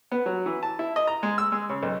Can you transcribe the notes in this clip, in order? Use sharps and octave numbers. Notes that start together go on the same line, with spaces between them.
B3
F#3
E3
A5
E4
D#5
A#5
G#3
E6
G#3
C#3
B1